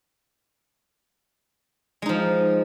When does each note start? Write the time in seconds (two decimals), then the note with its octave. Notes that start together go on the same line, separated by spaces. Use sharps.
2.02 G#3
2.06 D#4
2.09 F3